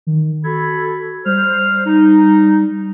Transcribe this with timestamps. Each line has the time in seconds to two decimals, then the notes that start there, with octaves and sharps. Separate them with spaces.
0.07 D#3
0.44 F#4 A4 B5 G#6
1.26 G3 C5 F6
1.86 D#4